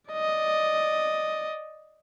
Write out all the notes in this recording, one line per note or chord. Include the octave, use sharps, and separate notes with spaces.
D5 D#5